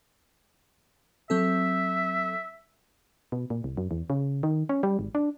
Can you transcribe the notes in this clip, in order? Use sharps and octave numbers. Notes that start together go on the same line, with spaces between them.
F#3 C4 A4 E5
B2
A#2
C2
F#2
E2
C#3
D#3
C#4
G3
G#1
D4